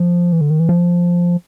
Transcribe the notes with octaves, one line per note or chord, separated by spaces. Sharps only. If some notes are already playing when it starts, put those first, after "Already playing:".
Already playing: F3
E3
D3
D#3
E3
F3